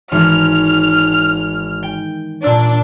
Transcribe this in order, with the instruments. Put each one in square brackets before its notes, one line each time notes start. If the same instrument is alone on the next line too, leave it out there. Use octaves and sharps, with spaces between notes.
[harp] G#1 E3 [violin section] F6
[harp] G5
[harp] A#2 E6 [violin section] D4